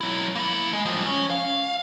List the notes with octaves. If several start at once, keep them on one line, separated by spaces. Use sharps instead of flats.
F#3 E4
A#3 E4
G#3
F3 G3
C#4
F5